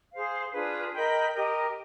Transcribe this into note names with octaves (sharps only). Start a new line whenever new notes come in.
G#4 C5 F5
D4 F4 G#4 B4
A#4 D#5 G5 B5
G4 A#4 D#5